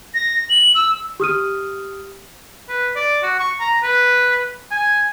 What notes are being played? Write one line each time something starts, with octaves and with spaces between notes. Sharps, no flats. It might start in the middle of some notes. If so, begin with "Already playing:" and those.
A#6
F#7
E6
G4 D#6 F6 D#7
B4
D5
F#4
C#6
A#5
B4
G#5